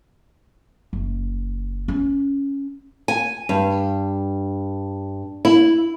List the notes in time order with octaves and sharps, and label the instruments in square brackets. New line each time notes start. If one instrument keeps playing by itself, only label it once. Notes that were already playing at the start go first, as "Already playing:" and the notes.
[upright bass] F#1
C#4
[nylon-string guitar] G#5
G2
E4